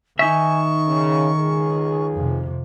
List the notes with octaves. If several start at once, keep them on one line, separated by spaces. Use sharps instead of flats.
D#3 D#4 E5 G#5 C#6
C#3
C#2 G#4
F2 C3